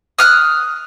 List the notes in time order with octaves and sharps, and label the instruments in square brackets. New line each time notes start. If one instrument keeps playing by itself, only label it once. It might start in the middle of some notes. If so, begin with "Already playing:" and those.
[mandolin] D#6 F6 F#6